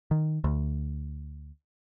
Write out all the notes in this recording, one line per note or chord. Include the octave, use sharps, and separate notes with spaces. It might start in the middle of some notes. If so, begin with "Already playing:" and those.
D#3
D2